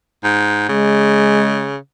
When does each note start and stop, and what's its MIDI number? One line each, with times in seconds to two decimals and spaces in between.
0.24 0.65 44
0.68 1.76 49
0.68 1.70 56